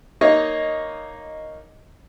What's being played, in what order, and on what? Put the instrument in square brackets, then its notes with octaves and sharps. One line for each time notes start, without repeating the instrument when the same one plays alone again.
[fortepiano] A#3 D#4 C#5 D#5